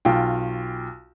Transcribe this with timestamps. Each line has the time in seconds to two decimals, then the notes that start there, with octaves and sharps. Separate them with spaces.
0.05 B1 F4 G5